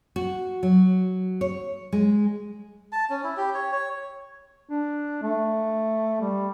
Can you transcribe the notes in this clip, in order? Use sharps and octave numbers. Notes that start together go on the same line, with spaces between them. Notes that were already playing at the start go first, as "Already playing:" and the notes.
F#4
F#3
C#5
G#3
A5
C#4
E4
G4
C#5
C#5
D4
A3
G3